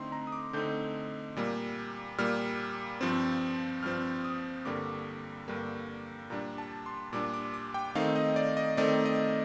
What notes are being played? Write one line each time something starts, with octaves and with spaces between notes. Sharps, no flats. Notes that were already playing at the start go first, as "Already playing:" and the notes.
Already playing: D3 A3 C4 D#4 C6
A#5
D#6
D6
D3 A3 C4 D#4 G6
A#2 G3 A#3
A#2 G3 A#3 F6
G2 F3 C4
G2 F3 C4 F6
D#6
G2 D3 G3 A#3 D6
G2 D3 G3 A#3
A#2 G3 D4 A#5
A5
C6
A#2 G3 D4 D6
D6
D6
G5
D#3 A3 C4 D#4 F5
D#5
D5
D#5
D#3 A3 C4 D#4 D5
D#5